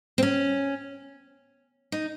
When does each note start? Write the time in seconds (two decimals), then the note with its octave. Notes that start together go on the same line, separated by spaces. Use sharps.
0.18 C4
0.23 C#4
1.92 D#4